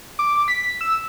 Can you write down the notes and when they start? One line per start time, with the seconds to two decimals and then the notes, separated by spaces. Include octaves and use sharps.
0.19 D6
0.48 B6
0.81 E6